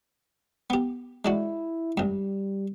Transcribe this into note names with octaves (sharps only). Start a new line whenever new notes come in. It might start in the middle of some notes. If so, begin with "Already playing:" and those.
B3 G4
G#3 D4 E4 F#4
C2 G2 G3